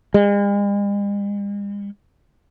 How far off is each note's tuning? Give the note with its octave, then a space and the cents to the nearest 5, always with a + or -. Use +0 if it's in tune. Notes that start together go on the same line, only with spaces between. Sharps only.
G#3 -45